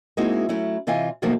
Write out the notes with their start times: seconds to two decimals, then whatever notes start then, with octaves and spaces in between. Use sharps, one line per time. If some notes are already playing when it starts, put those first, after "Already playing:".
0.17 G#3 A#3 C4 D#4 E4 F#4
0.49 F#3 A3 C#4 E4
0.87 C3 E3 F4 D#5 F5 G#5
1.22 B2 D#3 F3 F#3 A3 A#3